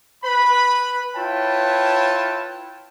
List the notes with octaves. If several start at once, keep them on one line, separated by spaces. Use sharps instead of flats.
B4 B5
E4 F4 B4 C#5 G5 A5